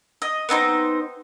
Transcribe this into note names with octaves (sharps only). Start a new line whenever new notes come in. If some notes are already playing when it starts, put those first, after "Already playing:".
D#5
B3 C4 D#4 C5